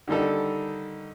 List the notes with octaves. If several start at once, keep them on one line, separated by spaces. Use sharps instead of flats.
D3 D#3 G3 D#4 A4